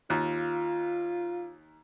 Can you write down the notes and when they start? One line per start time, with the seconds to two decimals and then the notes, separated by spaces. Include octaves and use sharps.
0.10 D#2 F4